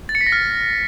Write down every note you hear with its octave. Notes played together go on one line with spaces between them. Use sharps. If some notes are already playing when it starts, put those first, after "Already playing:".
A6
C#7
B6
A#6
F6